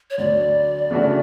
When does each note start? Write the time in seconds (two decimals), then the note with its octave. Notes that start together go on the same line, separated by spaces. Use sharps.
0.10 C#5
0.18 D2 D3 F#3 D5
0.91 C#3 E3 A3 D4 F#4